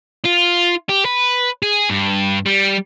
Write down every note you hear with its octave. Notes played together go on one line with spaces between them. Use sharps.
F4
G4
B4
G#4
G2
G3